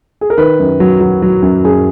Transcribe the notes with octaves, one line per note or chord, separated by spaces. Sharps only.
G#4
A#4
D#3 B4
F#2
F#3
F#3
F#3
F#2
F#2 G#4